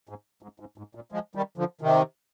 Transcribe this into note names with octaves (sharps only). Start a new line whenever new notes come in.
G#2
G#2
G#2
G#2
A#2
F3 G#3
D#3 G3
D3 F3
C3 D#3